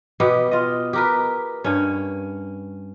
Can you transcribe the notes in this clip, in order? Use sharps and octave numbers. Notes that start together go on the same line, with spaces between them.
B2 B3 G4
F4 D#5
G4 A#4 B4
G2 C#4